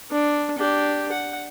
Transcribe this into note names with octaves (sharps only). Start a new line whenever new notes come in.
D4
D4 G4
F#5